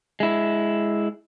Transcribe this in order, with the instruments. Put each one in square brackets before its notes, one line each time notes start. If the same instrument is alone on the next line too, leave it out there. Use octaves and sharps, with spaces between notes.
[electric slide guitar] G#3 E4